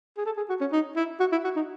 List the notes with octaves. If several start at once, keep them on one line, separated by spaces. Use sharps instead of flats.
G#4
A4
G#4
F#4
C#4
D#4
E4
F#4
E4
F#4
D#4